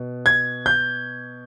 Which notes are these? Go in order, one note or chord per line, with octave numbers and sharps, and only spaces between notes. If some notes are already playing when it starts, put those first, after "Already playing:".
Already playing: B2
G#6
G6